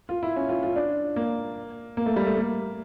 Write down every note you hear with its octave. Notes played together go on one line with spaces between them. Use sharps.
F4
E4
C#4
F4
F4
D4
A#3
A#3
A3
G3
A3
A#3